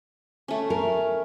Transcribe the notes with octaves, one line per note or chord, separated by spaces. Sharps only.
A3 C#4
A#4